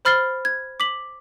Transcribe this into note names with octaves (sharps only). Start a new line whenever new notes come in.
C5 B5 F6 A6 C7 G7
G#6
D6 B6 F#7